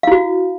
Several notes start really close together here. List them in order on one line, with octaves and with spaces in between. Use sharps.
F5 E4 F#4